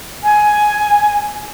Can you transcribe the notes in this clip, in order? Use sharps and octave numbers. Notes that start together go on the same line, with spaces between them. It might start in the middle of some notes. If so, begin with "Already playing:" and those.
G#5